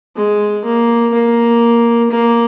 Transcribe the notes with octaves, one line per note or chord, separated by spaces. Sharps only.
G#3
A#3
A#3
A#3